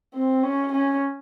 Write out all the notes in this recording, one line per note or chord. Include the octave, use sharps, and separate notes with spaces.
C4
C#4
C#4